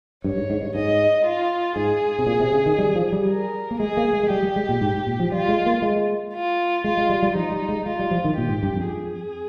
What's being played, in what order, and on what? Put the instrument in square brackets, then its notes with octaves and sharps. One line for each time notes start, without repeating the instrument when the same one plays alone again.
[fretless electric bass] G2 [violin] C#5
[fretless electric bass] G#2
G#2
G2
[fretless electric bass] G#2 [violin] D#5
[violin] F4
[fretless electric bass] G#2 [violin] G#4
[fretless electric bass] C3
A#2
C3
C#3
D#3
G3
F3
G3
[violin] A#4
[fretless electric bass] A#3
[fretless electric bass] G#3 [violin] G#4
[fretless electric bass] A#3
G#3
G#3
[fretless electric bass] G3 [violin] G4
[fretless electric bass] G3
G#3
A#2
G#2
G#2
A#2
F3
[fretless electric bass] G3 [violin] F4
[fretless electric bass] G#3
A#3
G#3
[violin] F4
[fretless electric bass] G#3 [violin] F4
[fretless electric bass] G#3
G3
G3
[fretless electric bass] F3 [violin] D#4
[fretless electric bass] G3
G#3
[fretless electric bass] G#3 [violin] F4
[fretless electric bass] G3
F3
D#3
[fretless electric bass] A#2 [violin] G4
[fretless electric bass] G#2
G2
F2
[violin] G#4